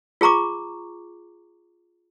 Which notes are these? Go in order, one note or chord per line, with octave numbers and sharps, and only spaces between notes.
F4 G#4 A#5 C#6 D6